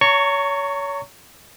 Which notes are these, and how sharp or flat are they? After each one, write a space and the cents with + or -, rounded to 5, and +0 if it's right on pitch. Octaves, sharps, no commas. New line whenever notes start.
C#5 +30 A#5 -30 C#6 +0